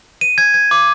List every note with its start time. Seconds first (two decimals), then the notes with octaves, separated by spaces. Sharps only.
0.21 D#7
0.38 G#6
0.54 G#6
0.71 D6